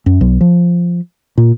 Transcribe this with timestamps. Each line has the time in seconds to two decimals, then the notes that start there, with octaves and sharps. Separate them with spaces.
0.06 F#2
0.21 B1
0.41 F3
1.38 A#2